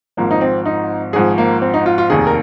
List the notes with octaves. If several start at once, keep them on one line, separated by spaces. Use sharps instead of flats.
G#1 G#2 F3 A#3
D#4
C4
D#4
G#1 G#2 F3 G#4
A#3
C4
D#4
F4
F4
F1 D#2 D#3 G#4
A#4